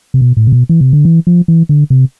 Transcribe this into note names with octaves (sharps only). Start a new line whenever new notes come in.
C3
B2
A2
C3
B2
E3
C3
D3
E3
F3
E3
D3
C3